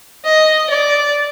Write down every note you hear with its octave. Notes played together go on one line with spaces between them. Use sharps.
D#5
D5